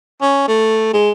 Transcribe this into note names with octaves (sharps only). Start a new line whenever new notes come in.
C#4
A3
G#3